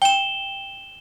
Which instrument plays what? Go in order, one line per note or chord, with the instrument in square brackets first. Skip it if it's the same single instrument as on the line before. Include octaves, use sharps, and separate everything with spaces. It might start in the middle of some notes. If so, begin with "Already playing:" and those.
[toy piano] G5 [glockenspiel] E7 G7